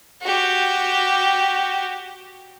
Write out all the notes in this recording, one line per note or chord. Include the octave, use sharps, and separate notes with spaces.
F#4 G4